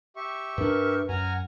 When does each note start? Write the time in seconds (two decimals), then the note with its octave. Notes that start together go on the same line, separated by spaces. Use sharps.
0.16 G4 E5 C#6
0.58 G2 D4 A#4 B4
1.09 F#2 F#5 G#5 A#5 F6